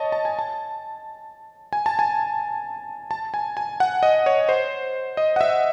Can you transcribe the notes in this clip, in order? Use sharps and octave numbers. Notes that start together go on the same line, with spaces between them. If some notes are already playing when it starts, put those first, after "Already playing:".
Already playing: C#5 D#5 A5
A5
G#5
A5
G#5
A5
G#5
A5
G#5
G#5
F#5
D#5
C#5
C5
D#5
F#5
E5